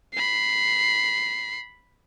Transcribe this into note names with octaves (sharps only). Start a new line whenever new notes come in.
B5 C7